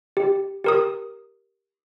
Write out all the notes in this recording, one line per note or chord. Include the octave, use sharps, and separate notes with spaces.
G4
G4 A#4 D#6